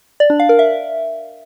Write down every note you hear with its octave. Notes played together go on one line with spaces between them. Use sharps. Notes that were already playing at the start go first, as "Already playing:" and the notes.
D5
D4
F5
A#4
E5